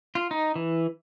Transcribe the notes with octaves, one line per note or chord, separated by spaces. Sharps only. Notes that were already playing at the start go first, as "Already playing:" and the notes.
F4
D#4
E3